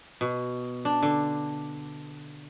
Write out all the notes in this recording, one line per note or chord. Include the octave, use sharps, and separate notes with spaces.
B2
D4
D3